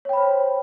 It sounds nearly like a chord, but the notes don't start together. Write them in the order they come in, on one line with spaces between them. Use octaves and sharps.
C#5 G5 B5 C5